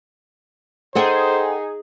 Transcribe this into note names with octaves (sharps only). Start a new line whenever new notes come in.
D#4 G#4 A4 C5 F#5 G5